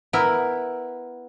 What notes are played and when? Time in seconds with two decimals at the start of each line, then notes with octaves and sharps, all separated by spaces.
0.13 B3 E4 A#4